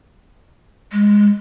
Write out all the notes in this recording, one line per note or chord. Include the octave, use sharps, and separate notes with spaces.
G#3